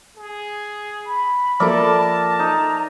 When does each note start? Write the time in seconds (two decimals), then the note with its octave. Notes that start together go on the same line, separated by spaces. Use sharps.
0.17 G#4
1.06 B5
1.60 F3 A#3 A4 A#4 D5 E5 A5
2.40 D#4 A#5